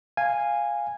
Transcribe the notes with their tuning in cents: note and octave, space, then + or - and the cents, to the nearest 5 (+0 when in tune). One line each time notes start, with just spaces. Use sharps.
F5 +0 G#5 -10